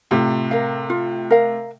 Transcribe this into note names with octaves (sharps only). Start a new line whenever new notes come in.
A2 C3 F4
A#4 F5
F4
A#4 F5